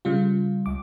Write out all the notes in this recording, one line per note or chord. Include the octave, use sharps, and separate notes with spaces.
C#3 G3 F4
C#2 D6